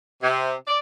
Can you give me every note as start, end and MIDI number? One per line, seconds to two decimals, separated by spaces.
0.23 0.53 48
0.67 0.79 74